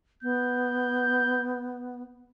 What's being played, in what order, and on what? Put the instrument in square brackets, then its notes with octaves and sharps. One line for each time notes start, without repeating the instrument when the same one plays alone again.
[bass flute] B3 [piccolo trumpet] G6